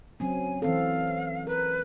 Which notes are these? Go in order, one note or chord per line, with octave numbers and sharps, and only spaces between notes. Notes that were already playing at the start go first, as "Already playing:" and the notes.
F#3 C4 C#4 G#5
E3 C4 A4 F5
A#4 B4